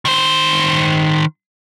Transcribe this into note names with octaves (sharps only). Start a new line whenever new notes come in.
D#3 C5